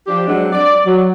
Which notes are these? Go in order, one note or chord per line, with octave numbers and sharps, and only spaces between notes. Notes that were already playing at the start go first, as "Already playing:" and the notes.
F3 D4 G4
F#3 G#3 C4 D4
D5
F#3